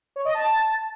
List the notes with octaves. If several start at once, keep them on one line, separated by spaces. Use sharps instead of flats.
C#5
D#5
A5